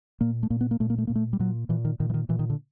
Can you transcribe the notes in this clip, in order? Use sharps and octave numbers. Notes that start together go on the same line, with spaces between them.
A#2 A#3
A3
A#2 A#3
B3
A#3
A#2 A3
A#3
A3
A#2 A#3
A3
G3
A#2 F#3
A#2 E3
D#3
A#2 D#3
E3
D#3
A#2 E3
D#3
D3